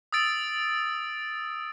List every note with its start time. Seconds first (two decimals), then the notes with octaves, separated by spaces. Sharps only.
0.13 D#6 E6 A6 D7